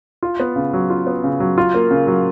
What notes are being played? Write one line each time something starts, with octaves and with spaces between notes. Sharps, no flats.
F4
B3
C#3
F#3
F4
B3
C#3
F#3
F4
A#3
C#3
F#3